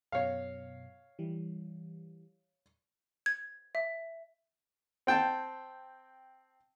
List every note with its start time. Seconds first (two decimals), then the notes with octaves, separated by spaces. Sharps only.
0.12 F#2 B2 C#5 F5
1.19 E3 G3
3.26 G#6
3.75 E5
5.07 C4 G5 A5